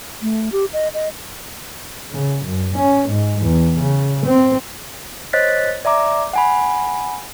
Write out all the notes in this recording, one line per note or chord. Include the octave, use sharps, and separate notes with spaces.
A3
G4
D#5
D#5
C#3
F#2
C#4
G#2
E2
C#3
C4
C5 C#5 D#5 F#6 A6 B6
D5 E5 A#5 D6
F#5 G#5 B5